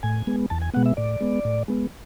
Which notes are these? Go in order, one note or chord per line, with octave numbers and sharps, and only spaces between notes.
A2 G#5
G#3 B3
E2 A5
G#5
B2 G#3 B3 F#5
E5
A2 D5
G#3 B3
A2
G#3 B3